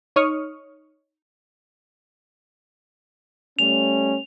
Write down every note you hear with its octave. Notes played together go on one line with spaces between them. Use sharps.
D#4 C#5 C#6 D#6 F6
G3 A3 C#4 F7